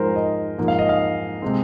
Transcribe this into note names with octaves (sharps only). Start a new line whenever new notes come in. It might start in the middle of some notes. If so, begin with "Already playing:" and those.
Already playing: G#2 F3 G#3 A#4 C5
D#5
G#2 F3 A#3
F5
D#5
F5
C3 G#3 C4